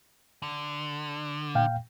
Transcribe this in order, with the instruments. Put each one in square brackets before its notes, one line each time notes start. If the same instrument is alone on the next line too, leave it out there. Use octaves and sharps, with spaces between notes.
[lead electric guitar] D3
[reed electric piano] A#2 F5 G5